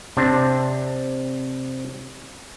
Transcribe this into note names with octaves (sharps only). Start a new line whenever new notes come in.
C3 C4 D4